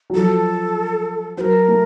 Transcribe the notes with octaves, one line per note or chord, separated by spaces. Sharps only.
F#3
F3 A4
F#3 A#4 C5
A3